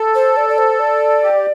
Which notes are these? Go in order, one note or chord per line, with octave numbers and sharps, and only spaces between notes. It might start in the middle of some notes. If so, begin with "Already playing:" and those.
Already playing: A4
C5
D5
D5
C5
D5
G4